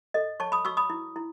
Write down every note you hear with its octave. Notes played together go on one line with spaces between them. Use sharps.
A4 D#5
C#5 A5 C#6
B5 D#6
F#4 C#6 E6
B5 D#6
E4
E4